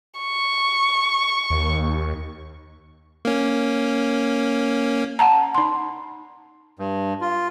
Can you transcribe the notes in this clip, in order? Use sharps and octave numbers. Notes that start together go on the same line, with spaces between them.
C#6
D#2
A#3 C#4
F#5 A5 A#5
D#4 C6
G2
F4